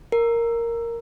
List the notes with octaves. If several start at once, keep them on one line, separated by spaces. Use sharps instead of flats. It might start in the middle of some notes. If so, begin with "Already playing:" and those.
A#4